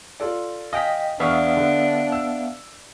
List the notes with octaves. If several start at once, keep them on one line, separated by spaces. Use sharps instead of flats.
F4 A4 D5
D#5 F5 G5 G#5 D#6 B6
E2 B3 D4 E5 F5 C#6 F6
D3
E6